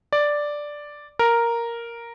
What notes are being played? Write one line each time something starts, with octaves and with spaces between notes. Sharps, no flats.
D5
A#4